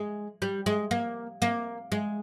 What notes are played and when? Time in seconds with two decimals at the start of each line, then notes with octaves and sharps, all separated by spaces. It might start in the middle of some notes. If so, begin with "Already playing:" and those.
Already playing: G#3
0.42 G3
0.66 G#3
0.91 A#3
1.42 A#3
1.92 G#3